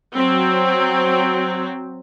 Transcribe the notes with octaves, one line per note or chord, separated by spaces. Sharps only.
F#3 C4